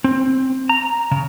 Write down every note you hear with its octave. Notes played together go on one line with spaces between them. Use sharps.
C4
A#5
C#3